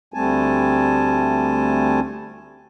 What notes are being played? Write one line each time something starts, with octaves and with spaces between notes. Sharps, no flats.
D2 G3 A3 C4 G#5 A5